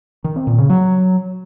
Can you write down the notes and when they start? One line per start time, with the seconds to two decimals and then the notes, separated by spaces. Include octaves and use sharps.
0.24 D#3
0.36 C4
0.47 A#2
0.58 C#3
0.70 F#3